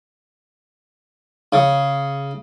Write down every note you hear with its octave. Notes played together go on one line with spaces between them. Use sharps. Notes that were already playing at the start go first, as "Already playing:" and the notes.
C#3